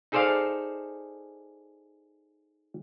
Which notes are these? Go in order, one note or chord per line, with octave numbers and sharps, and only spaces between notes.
D#4 G#4 A4 C5 D5 F5